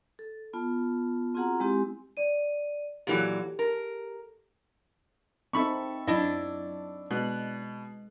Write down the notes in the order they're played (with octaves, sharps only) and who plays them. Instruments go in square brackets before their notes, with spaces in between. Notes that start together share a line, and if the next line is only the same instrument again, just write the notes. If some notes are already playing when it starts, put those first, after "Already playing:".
[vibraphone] A4
B3 F4 A5
C4 F4 F#4 G#4 F#5 A#5
G#3 C4 E4 G4 G#5
[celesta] D5 D#7
[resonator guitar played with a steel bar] A#2 E3 F#3 [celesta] G4 A4
[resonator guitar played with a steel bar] A#4
[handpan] C4 D#4 E5 [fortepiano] A4 B5 C#6
[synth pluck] F#2 [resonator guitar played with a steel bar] D4 E4 D#5
[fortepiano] B2 [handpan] G#3 [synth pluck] F#6